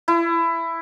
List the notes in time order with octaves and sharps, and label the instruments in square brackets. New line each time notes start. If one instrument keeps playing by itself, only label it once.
[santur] E4